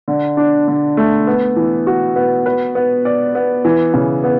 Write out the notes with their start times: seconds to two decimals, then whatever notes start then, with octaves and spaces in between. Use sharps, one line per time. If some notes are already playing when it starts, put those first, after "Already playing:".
0.08 D3
0.37 D4
0.68 D3
0.97 A3
1.27 B3
1.56 E3
1.87 F#4
2.16 B3
2.46 B4
2.75 B3
3.05 D5
3.35 B3
3.65 E3
3.94 C#3
4.24 B3